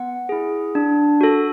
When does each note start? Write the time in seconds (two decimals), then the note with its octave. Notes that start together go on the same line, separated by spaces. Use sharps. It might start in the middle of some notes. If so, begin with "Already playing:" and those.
Already playing: B3 F#5
0.29 E4 G#4
0.75 D4
1.21 F#4 A4